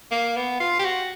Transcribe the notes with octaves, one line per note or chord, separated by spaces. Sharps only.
A#3
B3
F4
G4
F#4